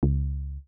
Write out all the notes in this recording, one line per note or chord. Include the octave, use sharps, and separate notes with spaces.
C#2